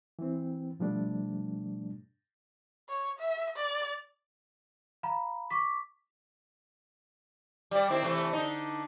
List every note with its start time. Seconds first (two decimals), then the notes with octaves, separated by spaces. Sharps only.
0.19 E3 C4
0.80 B2 F3 G3 A3 D4
2.89 C#5
3.19 E5
3.56 D5
5.03 F5 A#5 B5
5.50 C#6 D6 B6
7.71 G3 D5
7.90 D#3 C4 E4
8.03 C3 E3 A3
8.33 D3 D#4